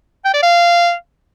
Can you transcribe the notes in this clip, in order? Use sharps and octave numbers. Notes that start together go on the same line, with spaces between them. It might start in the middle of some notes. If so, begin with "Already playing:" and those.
G5
D5
F5